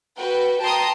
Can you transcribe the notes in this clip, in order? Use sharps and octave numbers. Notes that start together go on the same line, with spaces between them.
F#4 B4 G5
G5 A5 A#5 C6 D#6